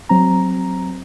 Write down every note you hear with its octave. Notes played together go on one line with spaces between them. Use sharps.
F#3 C4 A#5